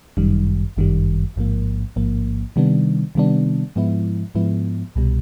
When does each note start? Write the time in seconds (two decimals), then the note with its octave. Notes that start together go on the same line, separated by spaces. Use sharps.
0.17 G1 F#2 D#3 G3
0.77 G1 F#2 D#3 G3
1.36 A1 G#2 F3 A#3
1.96 A1 G#2 F3 A#3
2.56 C3 D#3 G3 B3 D4
3.15 C3 D#3 G3 B3 D4
3.76 G#2 F3 G#3 B3 E4
4.35 G#2 F3 G#3 B3 E4
4.95 C2 B2 G3